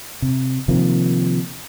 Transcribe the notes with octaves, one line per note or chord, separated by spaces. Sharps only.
C3
C3 D#3 F3 A#3